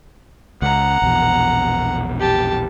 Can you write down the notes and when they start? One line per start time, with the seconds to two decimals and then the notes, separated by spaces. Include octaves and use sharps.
0.62 C#2 F#5 A#5
1.02 A#1 E2 B2
2.20 G4 A5